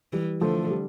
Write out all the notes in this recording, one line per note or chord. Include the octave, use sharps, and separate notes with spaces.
E3 G3
D3 F3 A3
G3